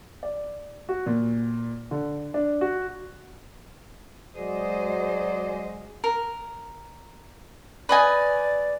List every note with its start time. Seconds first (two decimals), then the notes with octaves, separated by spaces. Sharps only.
0.23 D5
0.89 F#4
1.06 A#2
1.91 D3
2.34 D4
2.61 F#4
4.36 F#3 G#3 F#4 G#4 C5 D5 D#5
6.04 A#4
7.89 B4 D5 D#5 G#5